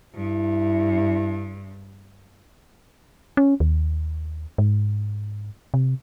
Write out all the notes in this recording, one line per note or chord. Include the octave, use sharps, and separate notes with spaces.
G2 E4
C#4
D#2
G#2
C3